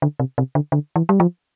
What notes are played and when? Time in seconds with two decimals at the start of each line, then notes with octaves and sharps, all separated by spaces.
0.02 D3
0.20 C3
0.38 C3
0.55 D3
0.72 D3
0.96 E3
1.09 G3
1.20 F3